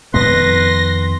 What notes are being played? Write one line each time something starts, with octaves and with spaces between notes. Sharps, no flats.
F2 D#3 B3 B4 C6 A#6